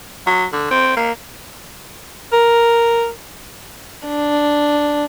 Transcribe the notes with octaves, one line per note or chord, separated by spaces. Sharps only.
F#3
D3
C4
A#3
A#4
D4